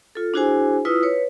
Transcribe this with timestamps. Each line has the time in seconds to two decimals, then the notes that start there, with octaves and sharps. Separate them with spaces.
0.15 F4 A4
0.34 D4 E4 F#4 G#4 C5 G#5
0.85 E4 F4 B4 D#6 E6
1.03 B4 C#5